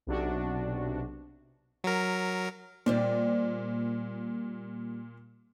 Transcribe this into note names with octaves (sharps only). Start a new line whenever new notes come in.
B1 C3 D4 F#4
F#3 A#4
A#2 G3 C5 D5